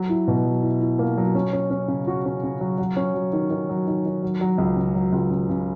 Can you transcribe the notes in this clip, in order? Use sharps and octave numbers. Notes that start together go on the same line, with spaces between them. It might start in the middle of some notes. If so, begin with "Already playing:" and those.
Already playing: F#3
E4
B2
F#3
E4
E4
A#3
F#3
C#4
C#4
C#4
C#3
F#4
C#4
C#3
F#3
F#3
C#4
F#3
D#3
D#3
F#3
D#3
D#3
F#3
F#3
C#2
C#3
F#3
C#2
C#3
C#3